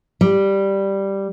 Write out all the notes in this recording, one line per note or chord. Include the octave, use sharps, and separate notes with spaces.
G3